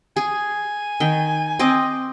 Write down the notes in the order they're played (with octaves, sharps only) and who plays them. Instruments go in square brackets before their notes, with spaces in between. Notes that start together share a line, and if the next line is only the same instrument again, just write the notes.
[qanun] G#4 [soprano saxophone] G#5
[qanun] D#3 G5
C4 D#5 D6